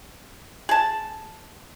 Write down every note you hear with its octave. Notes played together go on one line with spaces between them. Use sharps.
G#4 A5